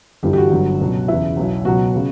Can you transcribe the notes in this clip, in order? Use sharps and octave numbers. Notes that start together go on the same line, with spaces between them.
G1 G2 E3 G4
G4
F#4
G1 G2 F#3
C#2 B2 F#3
E2 C#3 E3 E4
B1 B2 F#3
C#2 B2 F#3 F#4
C#3